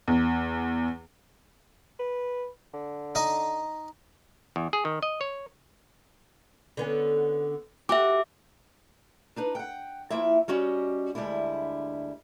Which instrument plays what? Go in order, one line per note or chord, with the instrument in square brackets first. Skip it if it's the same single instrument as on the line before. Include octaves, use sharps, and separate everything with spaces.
[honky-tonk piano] E2
[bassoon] B4
D3
[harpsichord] D#4 D#5
[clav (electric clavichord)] E2
G#4
D#3
D#5
C#5
[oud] D3 B3 C#4
[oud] F#4 G4 [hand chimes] E5 D6
[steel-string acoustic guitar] D4 D#4 B4
F#5 G5
F3 A#3 E4 E5
G3 C#4 F#4 D#5
D2 G3 G#3 D4 E4